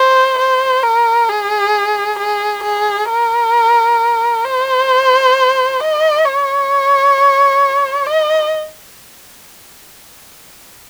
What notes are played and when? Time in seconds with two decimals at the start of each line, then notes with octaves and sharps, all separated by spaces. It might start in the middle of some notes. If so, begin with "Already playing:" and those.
Already playing: C5
0.39 C5
0.83 A#4
1.29 G#4
2.19 G#4
2.64 G#4
3.09 A#4
4.44 C5
5.80 D#5
6.25 C#5
8.06 D#5